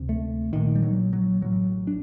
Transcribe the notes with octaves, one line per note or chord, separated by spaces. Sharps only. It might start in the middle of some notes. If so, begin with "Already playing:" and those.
Already playing: D2 C3
A3
A#1 A#2 D#3
G3
F#3
F#3
A1 A2 F#3
D4